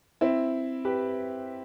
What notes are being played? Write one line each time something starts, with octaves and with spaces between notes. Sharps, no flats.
C4 E4
G4 B4